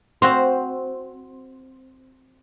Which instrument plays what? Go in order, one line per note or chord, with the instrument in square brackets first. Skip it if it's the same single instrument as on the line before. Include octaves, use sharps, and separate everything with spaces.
[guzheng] C4 F#4 F5 [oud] C5